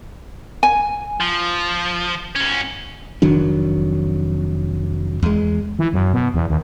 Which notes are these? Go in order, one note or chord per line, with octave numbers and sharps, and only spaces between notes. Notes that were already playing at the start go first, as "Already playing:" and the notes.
G#5
F3
G#2 C#4
F1 D#3 F#3 D4
E2 G#3
E3
F#2
B2
E2
D#2